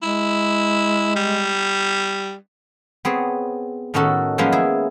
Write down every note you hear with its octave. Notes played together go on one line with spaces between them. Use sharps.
G#3 E4
G3
B3 C4 G#4 C#5
A2 D#3 C#4 D#4 F#4 A4
F3 F#3 G#3 A#3 B3 C#4
E4 G#4